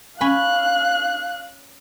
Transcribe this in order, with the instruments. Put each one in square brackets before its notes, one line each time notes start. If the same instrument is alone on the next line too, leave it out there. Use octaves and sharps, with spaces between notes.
[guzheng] C#4 B5 [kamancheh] F5 F#6